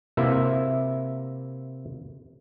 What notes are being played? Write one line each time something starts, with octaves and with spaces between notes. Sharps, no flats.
C3 A#3 E4 E5